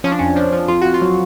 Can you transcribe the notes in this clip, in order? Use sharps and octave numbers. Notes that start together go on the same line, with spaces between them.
F3 C#4
D4
F2 C#4
F3 D4
F3
F2 F4
F2 F#4
F4
F#3